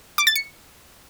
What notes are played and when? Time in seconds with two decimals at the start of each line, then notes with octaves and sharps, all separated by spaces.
0.18 D6
0.27 A6
0.36 C#7